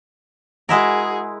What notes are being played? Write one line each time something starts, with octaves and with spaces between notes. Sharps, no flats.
G#3 E4 F#4 G#4 A#4